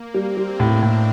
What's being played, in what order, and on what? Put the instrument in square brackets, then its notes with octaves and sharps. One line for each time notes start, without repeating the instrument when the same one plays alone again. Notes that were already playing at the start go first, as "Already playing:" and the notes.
Already playing: [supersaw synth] A#3
[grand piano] G3 [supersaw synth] C4
[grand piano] G3
[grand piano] A2 [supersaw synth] D4
[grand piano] A2